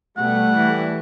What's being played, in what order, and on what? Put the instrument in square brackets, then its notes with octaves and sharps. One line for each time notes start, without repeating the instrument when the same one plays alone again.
[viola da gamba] B2 [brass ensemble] G3 [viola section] A3 [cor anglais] F#5
[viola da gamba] E3